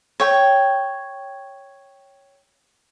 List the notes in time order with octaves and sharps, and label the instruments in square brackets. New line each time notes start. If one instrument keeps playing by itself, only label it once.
[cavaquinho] C#5 G5